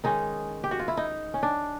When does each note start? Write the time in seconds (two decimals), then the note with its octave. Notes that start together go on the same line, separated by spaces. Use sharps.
0.04 D#3 G#3 C#4 D#4
0.64 G4
0.71 F#4
0.79 F4
0.88 E4
0.97 D#4
1.34 C#4
1.43 D4